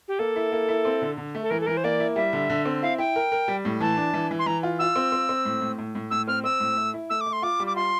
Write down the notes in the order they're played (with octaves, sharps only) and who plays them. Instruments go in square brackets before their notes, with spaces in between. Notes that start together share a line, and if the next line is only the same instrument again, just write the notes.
[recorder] G4
[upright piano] A#3 [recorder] A4
[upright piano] E4
A#3
E4
C4
D3
D3
A3
[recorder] A4
[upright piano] E3 [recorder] A#4
[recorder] A4
[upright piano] E3 [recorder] A#4
[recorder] C5
[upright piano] A#3 [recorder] D5
[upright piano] E4
[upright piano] G3 [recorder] E5
[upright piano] D3
D3
C4
[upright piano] E4 [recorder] F5
[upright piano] E4 [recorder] G5
[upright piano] A#4
A#4
G3
A2
[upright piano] E3 [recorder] A5
[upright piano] D4
E3
E3
[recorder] C6
[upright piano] E3 [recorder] A#5
[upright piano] F4
[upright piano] F4 [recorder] E6
[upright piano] C4
C4
C4
A2
A2
A2
A2
[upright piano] A2 [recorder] E6
[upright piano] C4 [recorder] F6
[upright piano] C4 [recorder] E6
[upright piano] A2
A3
E4
[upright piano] A3 [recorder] E6
[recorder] D6
[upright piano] A3
[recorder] C6
[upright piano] F4 [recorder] D6
[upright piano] G3
[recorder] D6
[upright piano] F4 [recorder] C6